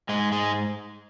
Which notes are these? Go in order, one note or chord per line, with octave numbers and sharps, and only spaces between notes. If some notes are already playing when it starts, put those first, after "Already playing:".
G#2 G#3
G#3